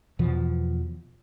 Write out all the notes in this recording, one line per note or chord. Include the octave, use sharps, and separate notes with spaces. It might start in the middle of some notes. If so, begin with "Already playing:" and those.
E2 B2 E3 F3